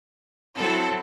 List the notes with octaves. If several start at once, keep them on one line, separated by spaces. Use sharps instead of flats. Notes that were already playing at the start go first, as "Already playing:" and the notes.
F#3 C4 E4 A4